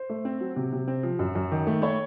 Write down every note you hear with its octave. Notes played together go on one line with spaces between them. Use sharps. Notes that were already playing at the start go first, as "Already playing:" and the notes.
Already playing: C5
A3
C4
F#3
C3
C3
C4
F3
F#2
F#2
D#3
A3
A3 C#5